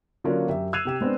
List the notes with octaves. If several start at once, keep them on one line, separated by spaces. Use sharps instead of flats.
D3 F#3 A#3 C#4 D4 F4
F#2 G4 E5
E6 F#6 G#6 C7 D#7 F7
C3 G4 E7
G#3 B3 C4 D4